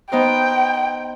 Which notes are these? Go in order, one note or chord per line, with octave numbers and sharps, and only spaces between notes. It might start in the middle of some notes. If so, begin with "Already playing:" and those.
B3 D#4 C5 G5